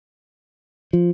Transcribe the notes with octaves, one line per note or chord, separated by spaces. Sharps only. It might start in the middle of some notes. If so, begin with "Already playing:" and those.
F3